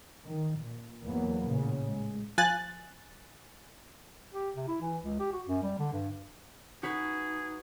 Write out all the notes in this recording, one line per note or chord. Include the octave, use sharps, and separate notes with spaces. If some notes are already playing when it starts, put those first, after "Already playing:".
D#3
A#2
E2 E3 F#3 A#3 B3
A1 A#2 C#3
G#3
F3 G#5 F#6 A6
G4
C3
E4
E3
C#2
G4
F#4
F#2
G3
D3
G2
D#4 F#4 G#4 B4